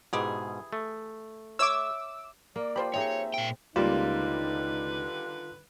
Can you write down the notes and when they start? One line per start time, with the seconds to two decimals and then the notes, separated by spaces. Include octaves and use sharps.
0.13 G#2 B2 E3 G4 G#4
0.73 A3
1.59 C#5 E5 D6 E6
2.56 A#3 D5
2.76 F3 G4 C5 B5
2.94 C4 D#4 G#4 C#5 E5
3.34 A#2 G5
3.76 C#2 D3 D#3 G3 A#3 D#4 F4 B4